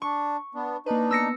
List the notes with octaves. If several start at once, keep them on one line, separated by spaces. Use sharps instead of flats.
D4 C#6
B3 D4
A#3 D4 D#4 B4
B3 E6 A#6 C#7